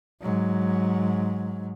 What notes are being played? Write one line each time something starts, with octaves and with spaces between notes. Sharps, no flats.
G#2 F#3